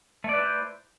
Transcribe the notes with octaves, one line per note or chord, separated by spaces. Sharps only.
A3 E4 B4 C5 D5